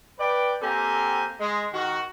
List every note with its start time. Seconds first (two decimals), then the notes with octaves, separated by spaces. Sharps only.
0.19 B4 D5 G5
0.62 A#3 C4 G4 A4 G#5 A#5
1.40 G#3
1.73 D#3 F#4